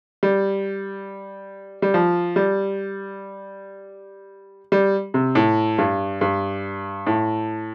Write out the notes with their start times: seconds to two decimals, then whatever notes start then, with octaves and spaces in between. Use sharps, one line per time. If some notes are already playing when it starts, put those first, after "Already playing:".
0.23 G3
1.82 G3
1.94 F3
2.36 G3
4.72 G3
5.14 C3
5.35 A2
5.78 G2
6.21 G2
7.07 A2